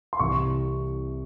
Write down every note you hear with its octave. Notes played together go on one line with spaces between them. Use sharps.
C6
C2 C3 E3 C#6